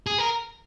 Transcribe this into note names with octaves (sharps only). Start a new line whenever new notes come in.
G#4
A#4